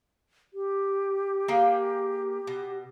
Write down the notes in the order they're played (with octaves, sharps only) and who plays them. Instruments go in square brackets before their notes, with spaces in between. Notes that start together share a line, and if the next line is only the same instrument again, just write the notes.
[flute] G4
[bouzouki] A#3 G#4 G5
B2